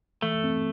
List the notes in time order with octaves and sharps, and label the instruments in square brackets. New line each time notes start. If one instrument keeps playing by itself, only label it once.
[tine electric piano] E3 [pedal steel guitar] A3
[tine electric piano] C4